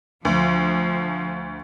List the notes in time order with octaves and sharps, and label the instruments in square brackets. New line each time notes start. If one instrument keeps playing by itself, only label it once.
[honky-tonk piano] D2 [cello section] F3